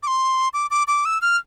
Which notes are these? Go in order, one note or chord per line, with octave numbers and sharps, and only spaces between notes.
D6
C6
D6
D6
D6
E6
F6